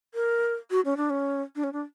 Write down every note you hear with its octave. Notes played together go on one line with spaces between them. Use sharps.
A#4
F#4
C#4
D4
C#4
D4
C#4
D4